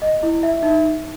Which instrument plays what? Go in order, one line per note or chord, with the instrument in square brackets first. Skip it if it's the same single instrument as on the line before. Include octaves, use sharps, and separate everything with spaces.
[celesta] D#5
E4
E5
D#4